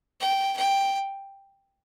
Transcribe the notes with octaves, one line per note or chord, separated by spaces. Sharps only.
G5
G5